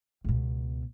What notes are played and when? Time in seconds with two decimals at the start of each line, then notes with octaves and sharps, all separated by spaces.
0.24 C#2 B2